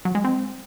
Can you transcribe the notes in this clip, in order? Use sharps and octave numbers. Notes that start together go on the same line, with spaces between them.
F#3
G#3
C4